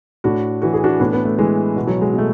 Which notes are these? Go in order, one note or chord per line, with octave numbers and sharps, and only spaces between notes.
A2 D4 F#4
E3 F#4
G#4
D4 F#4
A2 B3 D4
B3
A3
E3 G#3
B2
F#3
G#3
B2 A3